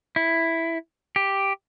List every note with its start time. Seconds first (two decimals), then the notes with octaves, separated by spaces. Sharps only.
0.16 E4
1.16 G4